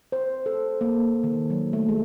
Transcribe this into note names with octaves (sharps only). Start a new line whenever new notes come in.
C5
A4
A#3
D#3
F#3
A3
G#3